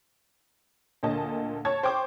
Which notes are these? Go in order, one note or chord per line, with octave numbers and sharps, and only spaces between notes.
D2 A#2 D#5 A5
C#5 A5 G#6
C5 G5 C#6 D6